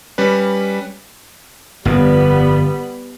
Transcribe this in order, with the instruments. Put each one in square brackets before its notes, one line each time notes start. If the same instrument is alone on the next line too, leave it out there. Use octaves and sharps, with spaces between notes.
[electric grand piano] G3 C#4 B4
[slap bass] G1 F2 [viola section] G3 B3 B5